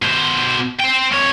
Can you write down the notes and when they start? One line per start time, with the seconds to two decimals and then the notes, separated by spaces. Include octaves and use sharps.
0.02 B2 C5
0.80 C5 G5
1.13 F2 C#5